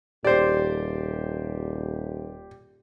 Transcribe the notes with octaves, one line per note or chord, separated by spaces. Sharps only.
D#1 G4 C5 D5